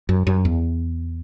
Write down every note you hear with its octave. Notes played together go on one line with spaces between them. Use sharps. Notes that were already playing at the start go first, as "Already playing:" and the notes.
F#2
F#2
E2